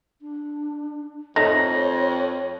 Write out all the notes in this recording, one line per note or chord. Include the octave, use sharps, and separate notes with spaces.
D4
F2 A3 D#4 C#5 A#6